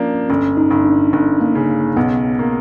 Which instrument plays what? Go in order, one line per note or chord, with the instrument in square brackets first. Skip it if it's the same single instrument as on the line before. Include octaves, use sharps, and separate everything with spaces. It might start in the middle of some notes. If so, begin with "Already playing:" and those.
Already playing: [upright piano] F3 A#3 D4 [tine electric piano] C#4
[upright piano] G1 [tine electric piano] C#4
[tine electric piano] D#4
[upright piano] G1
[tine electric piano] D4
[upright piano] G1
[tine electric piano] A#3
[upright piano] C#3
[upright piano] B1 [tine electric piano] B3
[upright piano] A#3